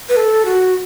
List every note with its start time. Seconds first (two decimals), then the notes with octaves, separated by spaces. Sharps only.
0.09 B4
0.17 A4
0.46 F#4